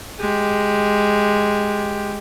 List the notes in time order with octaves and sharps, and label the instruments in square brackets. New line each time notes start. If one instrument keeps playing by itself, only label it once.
[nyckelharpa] G#3 G4